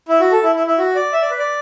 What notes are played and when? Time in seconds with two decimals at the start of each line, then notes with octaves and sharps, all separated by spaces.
0.08 E4
0.20 F#4
0.32 A4
0.43 E4
0.55 E4
0.67 E4
0.78 F#4
0.95 D5
1.13 E5
1.22 D5
1.30 B4
1.39 D5